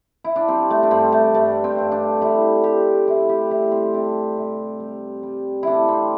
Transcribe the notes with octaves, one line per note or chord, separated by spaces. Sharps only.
E4
D4
G3 C4
A3
D4
G2 C4
A3
G2 A3
C4
G2
D4
G3 E4
G3 G4
A2 E4
G4
G3 E4
C4
C3 D4
C3
G3
G3
A2 D4 E4
C4